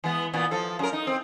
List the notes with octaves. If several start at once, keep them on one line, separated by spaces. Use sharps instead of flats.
E3 G#3 B3
A#2 E3 B3
F3 A4
F#2 A#4
D#4
C4